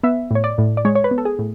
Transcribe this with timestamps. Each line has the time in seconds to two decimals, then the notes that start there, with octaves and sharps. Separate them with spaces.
0.03 B3 E5
0.31 A2 C#5
0.44 D5
0.58 A2
0.77 D5
0.85 G#3 C#5
0.95 C#5
1.04 B4
1.11 B3
1.18 A4
1.25 G#4
1.39 A2